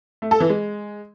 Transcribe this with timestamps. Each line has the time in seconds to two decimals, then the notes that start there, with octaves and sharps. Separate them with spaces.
0.22 A3
0.31 A4
0.40 E3
0.50 G#3